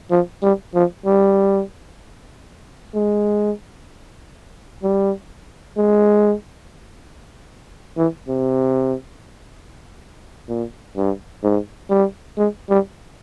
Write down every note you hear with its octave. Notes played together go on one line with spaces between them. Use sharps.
F3
G3
F3
G3
G#3
G3
G#3
E3
C3
A#2
G2
G#2
G3
G#3
G3